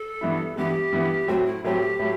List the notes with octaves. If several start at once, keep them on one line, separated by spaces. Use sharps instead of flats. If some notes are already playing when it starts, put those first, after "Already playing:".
Already playing: A4
G2 E3 B3 E4
G2 E3 B3 E4 G4
G2 E3 B3 E4
A2 F#3 A3 C4 F#4
E4
A2 F#3 A3 C4 G4
A2 F#3 A3